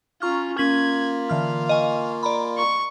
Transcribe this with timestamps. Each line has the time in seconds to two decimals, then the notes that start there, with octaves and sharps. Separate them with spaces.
0.22 C#4 F4 A#5 C#6 F6
0.58 A#3 C#4 F4 G#6 B6 F#7
1.29 D3 E3 F5 F6
1.69 D#5 G#5 C#6
2.23 D5 A#5 B5
2.57 C#6